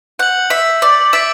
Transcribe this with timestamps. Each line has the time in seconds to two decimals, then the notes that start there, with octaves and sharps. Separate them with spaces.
0.19 F#5 G6 C#7 F#7
0.50 E5
0.82 D5
1.13 E5 D6 A6 D7